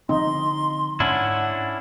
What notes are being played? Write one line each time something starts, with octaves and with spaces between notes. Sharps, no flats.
D3 F3 C4 D#4 C6
G#2 C#4 D4 E4 F#5